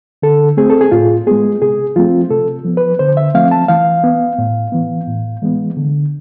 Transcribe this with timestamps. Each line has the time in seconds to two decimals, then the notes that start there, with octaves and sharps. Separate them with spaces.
0.23 D3 A4
0.57 A3 C4 G#4
0.70 A4
0.81 G#4
0.92 A2 F4
1.27 G#3 B3 G#4
1.62 C3 G#4
1.96 F3 A3 C4 F4
2.30 C3 A4
2.65 F3 B3
2.77 B4
2.99 D3 C5
3.17 E5
3.35 F3 A3 C4 F5
3.51 A5
3.68 E3 F5
4.04 B3
4.38 A2
4.72 E3 B3
5.08 A2
5.42 E3 G#3 B3
5.77 D3